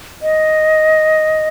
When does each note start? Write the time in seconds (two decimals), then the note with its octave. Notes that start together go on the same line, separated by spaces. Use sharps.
0.22 D#5